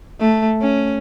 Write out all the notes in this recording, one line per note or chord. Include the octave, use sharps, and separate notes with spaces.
A3
C#4